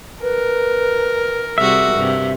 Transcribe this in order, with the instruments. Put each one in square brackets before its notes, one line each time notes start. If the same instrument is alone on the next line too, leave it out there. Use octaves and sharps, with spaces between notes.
[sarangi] A#4 [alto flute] B4
[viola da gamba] C3 G3 F#4 [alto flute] G#4 [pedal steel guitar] E5
[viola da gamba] G2 C3